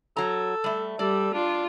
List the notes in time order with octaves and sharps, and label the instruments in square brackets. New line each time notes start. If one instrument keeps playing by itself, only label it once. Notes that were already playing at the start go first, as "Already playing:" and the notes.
[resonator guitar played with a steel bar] F#3 A#5 [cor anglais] A4
[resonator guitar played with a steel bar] G3 A3
[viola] G3 [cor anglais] A4 [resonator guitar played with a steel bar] D5
[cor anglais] D4 [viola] F4